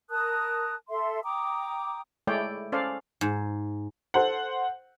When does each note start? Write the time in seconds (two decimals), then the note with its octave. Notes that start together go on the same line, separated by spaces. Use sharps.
0.10 A#4 A5 D#6 F#6
0.89 A4 E5 C6
1.23 G5 A#5 D6 D#6
2.27 G#3 A3 E4 C#5 D5 G5
2.72 C#4 A4 C5 D5 F5
3.21 G#2
4.14 A4 C5 F#5